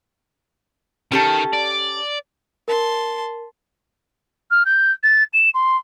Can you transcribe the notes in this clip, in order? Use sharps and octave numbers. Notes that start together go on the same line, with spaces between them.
D#3 C#4 G4 A4
D5
A#4 A5 C6
F6
G6
A6
E7
C6